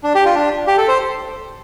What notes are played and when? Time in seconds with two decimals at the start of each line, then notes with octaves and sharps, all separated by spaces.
0.04 D4
0.15 G4
0.25 F4
0.35 D4
0.67 G4
0.78 A4
0.88 C5